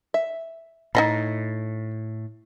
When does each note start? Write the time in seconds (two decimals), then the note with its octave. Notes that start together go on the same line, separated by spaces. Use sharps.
0.14 E5
0.95 A2 D#4 D#5 B5